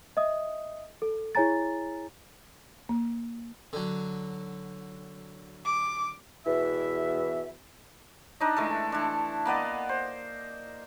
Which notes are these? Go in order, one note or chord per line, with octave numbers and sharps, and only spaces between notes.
D#5 E5 D#6
A4
E4 G#4 C#5 G#5 A#5 A6
A#3
D3 F#3
D6
E2 B2 E3 E5
D4 D#4 D#5
E3 G#3 A3 A4
E3 D4
A#3 B3 D5 D#5
C5